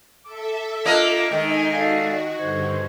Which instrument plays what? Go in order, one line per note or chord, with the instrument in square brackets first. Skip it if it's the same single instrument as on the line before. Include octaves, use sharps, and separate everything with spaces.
[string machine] A4 E5 [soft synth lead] D6
[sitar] A#3 D4 D#5 [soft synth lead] F4
[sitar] D#3 [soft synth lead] G#3 [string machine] D#4 D#5 G#5
[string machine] F#4 [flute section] A4 D5 F5
[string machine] G2 D3 [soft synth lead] C5 [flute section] C#6 G#6